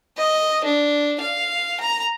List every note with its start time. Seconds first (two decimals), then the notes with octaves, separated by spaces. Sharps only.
0.18 D#5
0.65 D4
1.21 F5
1.80 A#5